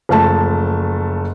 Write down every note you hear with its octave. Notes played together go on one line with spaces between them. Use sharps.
F#1 F3 A3 A5